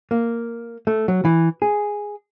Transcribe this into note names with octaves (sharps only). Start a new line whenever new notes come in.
A#3
A3
F#3
E3
G#4